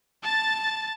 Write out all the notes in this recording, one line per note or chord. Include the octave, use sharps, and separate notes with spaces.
A5 A6